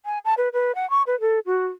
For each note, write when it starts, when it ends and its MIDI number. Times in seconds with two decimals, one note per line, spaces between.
0.05 0.19 80
0.25 0.34 81
0.38 0.49 71
0.53 0.75 71
0.75 0.89 78
0.90 1.03 85
1.07 1.19 71
1.21 1.39 69
1.46 1.67 66